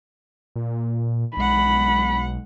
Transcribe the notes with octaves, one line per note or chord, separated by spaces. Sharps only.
A#2
B1 G#3 F#5 B5